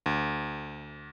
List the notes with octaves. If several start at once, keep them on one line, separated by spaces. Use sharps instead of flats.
D2